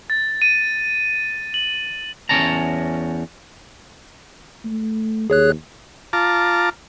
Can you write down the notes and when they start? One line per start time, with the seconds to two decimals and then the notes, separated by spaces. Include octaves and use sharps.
0.10 A6
0.42 D#7
1.54 F#7
2.29 E2 G#3 C#4 C#5 A5 A#5
4.65 A3
5.30 D#2 G#4 C#5 F#6
6.13 F4 A5 A#5 D6